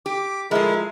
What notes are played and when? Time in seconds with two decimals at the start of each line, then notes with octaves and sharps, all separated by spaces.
0.06 G4 D6
0.51 F3 G#3 A3 E4 A#4